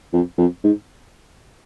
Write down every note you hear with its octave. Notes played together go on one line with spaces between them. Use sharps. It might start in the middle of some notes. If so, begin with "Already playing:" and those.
F2
F2
G#2